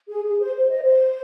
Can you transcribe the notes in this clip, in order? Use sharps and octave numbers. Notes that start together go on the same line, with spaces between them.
G#4
G#4
C5
C5
D#5
C5